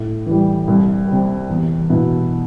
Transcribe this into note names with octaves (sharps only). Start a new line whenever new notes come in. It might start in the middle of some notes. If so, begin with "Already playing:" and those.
Already playing: A2
E3 G3
C2
C3 G3
E2
B2 B3 E4